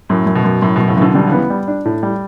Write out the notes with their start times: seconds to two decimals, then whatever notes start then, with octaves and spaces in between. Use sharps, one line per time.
0.09 F#2 A2
0.26 F#2
0.35 B2
0.44 F#2
0.62 F#2 A2
0.76 F#2 B2
0.88 A2 C#3
0.97 F#2 E3
1.01 B2 D3
1.15 B2 D3 G3
1.27 C#3 E3 B3
1.50 G3
1.68 D4
1.85 A2
2.03 G3